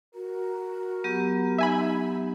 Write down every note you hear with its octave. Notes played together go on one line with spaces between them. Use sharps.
F#4 A#4
F#3 B3 G4
D#4 E5 G#5 B5